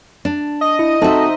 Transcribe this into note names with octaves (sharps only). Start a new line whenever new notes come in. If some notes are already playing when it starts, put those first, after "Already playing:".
D4
D#5
E4
C4 D#4 F#4 A4 C5 E5 A5